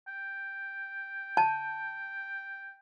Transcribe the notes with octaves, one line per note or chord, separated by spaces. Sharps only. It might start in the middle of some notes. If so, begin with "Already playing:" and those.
G5
A5